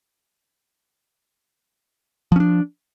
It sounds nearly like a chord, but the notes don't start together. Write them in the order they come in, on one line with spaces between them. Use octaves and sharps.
F3 C#4 D4